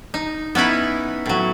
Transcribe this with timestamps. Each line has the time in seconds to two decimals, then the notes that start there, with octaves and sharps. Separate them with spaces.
0.14 D#4
0.55 B3 C#4 D#4 E4 B4
1.26 A2 F#3